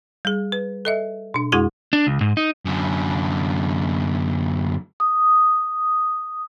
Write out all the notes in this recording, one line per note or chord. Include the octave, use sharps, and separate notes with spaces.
G3 G#4
B4
A4 D#5 E5
B2 D4
F2 G#3 E4 F#4 G#4 C6
D4
C#2
G#2
D#4
F#2 D3
D#6